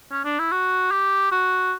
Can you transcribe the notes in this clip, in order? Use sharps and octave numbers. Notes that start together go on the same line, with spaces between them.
C#4
D4
E4
F#4
G4
F#4